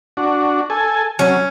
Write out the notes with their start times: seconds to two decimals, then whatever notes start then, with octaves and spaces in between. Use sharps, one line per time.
0.17 D4 F#4
0.70 A4 G#5
1.19 F#3 C#4